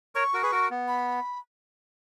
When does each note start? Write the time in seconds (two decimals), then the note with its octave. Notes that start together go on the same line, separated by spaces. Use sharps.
0.15 A#4 C#5 C#6
0.34 F#4 A#4
0.42 G#4 B4
0.52 F#4 A#4
0.70 B3
0.88 B5